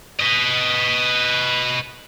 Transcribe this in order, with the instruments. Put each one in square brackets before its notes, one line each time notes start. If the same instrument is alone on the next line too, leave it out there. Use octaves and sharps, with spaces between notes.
[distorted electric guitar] B4 D#5